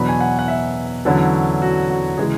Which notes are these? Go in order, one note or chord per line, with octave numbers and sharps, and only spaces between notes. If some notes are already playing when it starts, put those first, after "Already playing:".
Already playing: E2 B2 F#3 B3 D4 B5
G#5
F#5
F#5
E5
E2 D3 F#3 C#4 E4 A4
F#4
F#4
C#3 E3 G#3 G#4